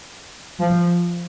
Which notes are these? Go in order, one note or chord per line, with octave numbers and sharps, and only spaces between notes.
F3